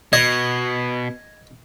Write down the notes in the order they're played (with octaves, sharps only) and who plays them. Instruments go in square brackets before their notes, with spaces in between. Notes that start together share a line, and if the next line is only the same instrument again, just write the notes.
[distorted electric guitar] B2 [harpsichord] D#5 [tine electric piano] G#6